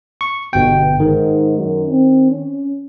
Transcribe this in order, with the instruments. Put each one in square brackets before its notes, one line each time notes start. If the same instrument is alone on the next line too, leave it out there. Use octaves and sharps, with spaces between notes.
[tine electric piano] C#6
[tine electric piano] G1 G5 [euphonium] B2
[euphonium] G#2 [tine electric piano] D#3
[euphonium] F#2
C4
C#4